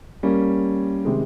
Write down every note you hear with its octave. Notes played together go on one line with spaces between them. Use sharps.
G3 A#3 C#4
C3 D#3 G#3